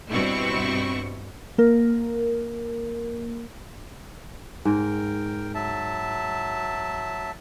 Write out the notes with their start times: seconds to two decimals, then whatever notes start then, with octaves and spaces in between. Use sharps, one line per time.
0.11 G2 B2 C4 E4 C#6
1.58 A#3 A#4
4.65 G#2 A#4 G5
5.55 F#3 E5 A5